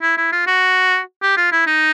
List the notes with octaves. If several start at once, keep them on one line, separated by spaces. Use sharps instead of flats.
E4
E4
F4
F#4
G4
F4
E4
D#4